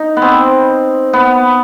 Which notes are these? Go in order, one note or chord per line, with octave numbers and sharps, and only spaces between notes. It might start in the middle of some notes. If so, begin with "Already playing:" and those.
Already playing: D#4
B3
C4
B3